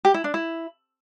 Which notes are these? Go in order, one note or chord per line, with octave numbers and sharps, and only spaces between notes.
G4
E4
D4
E4